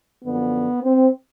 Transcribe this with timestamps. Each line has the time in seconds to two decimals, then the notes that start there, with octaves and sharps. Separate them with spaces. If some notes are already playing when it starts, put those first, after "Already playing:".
0.24 F#2 D3 F3 B3
0.83 C4